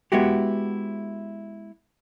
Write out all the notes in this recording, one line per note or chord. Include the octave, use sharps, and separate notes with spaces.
G#3 B3 E4 F#4 G4